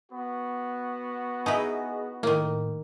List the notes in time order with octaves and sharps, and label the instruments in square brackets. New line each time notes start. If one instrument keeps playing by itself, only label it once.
[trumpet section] B3 F#4
[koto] D#4 E4 B4 [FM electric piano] G#4 D#5
[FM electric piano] A2 [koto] D#3 A#3